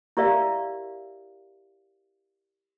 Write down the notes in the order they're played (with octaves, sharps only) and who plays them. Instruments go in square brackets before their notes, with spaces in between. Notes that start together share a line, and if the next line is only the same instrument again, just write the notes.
[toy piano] E4 G4 A#4 D5 E5 F5